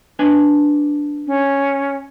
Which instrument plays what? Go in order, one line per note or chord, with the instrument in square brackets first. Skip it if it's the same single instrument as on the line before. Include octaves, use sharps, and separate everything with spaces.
[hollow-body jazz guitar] D4 B4 G#5
[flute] C#4